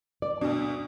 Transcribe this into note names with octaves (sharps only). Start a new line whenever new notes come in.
D5
D2 B2 D4